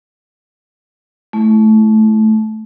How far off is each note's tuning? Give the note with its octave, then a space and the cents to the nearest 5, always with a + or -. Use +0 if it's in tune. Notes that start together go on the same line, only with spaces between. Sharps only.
A3 -20 E4 +0